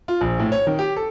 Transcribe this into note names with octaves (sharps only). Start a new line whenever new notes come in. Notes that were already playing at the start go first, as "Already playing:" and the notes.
F4
A#1
A2
C#5
D#3
G4
A4